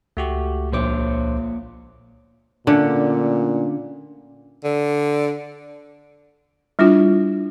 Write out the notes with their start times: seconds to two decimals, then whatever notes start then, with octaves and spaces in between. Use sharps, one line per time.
0.17 C#2 A3 F#4 G4
0.72 A#1 A#2 C5 C#5 D6
2.67 A#2 D3 A3 C#4 D4
4.64 D3
6.79 G3 D4 E4 F4